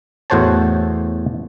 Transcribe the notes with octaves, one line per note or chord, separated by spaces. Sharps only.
E2 A2 F#4 C5 C#5 A5